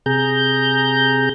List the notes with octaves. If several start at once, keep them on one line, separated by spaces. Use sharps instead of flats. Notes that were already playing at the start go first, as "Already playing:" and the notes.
C3 G#4 A#5 G6